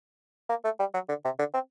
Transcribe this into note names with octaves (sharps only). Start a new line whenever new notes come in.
A#3
A3
G3
F#3
D3
C3
D3
C4